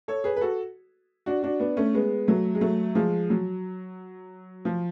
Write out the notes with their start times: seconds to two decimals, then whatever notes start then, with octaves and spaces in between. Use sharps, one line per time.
0.08 A4 C#5
0.24 G#4 B4
0.37 B4
0.41 F#4 A4
1.26 D4 F#4
1.43 D4 F#4
1.60 B3 D4
1.77 A3 C#4
1.94 G#3 B3
2.28 F#3 A3
2.55 G#3
2.61 F#3 A3
2.95 F3 G#3
3.30 F#3
4.65 F3